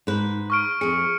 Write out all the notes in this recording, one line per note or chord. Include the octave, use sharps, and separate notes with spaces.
G#2 B4
C#6 F6 D7
F2 G#4 C#7